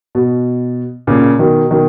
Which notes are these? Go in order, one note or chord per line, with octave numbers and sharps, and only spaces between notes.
B2
A#2 C#3
B2 D#3
B2 D#3